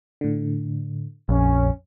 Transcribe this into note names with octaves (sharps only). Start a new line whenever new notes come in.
A2 D3
A#1 F2 C#4